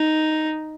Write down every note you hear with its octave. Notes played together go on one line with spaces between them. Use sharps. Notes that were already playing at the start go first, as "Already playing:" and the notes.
Already playing: D#4